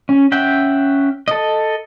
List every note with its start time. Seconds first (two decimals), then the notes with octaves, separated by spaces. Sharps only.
0.09 C#4
0.32 C#4 E5 F#5 G5
1.28 A4 D#5